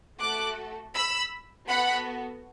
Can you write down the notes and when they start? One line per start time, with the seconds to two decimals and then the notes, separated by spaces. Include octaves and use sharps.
0.20 A3 F#4 A4 D6 F#6
0.95 B5 E6
1.68 B3 F#4 A4 F#5 B5